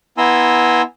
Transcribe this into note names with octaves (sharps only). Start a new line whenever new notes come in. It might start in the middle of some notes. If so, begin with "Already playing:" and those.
B3 E4 G#5 A#5 C6 E6